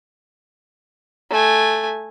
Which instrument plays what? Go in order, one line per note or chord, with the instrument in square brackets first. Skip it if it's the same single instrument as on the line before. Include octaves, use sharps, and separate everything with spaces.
[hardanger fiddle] A3 G#5